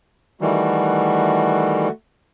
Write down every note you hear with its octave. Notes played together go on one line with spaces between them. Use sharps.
D#3 E3 G3 A3 F#4